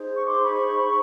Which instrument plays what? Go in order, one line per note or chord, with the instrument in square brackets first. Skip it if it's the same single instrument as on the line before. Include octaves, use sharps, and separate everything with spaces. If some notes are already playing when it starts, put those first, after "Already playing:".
Already playing: [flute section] D#4 G#4 C5
C#6
C6 D6
B5 C#6